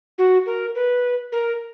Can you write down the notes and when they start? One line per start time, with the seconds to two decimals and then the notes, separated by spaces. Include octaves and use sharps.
0.18 F#4
0.46 A#4
0.75 B4
1.32 A#4